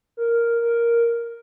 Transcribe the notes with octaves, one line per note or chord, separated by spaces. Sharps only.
A#4
A#4